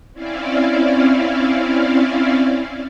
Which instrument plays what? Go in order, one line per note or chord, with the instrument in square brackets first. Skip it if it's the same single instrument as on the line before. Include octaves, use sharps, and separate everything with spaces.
[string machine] C4 C#4 E4 D5 F5